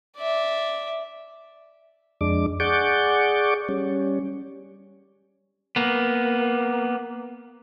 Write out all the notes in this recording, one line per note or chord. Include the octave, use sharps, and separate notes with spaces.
D5 E5
F2 G#3 D4 D6
G#4 D5 F#5 C#6 D6 G6
G3 C#4
A#3 B3